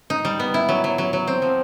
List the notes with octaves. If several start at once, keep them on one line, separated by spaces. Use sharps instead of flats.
D#4
G3
B3
E4
F#3
F#3
F#3
F#3
C4
F3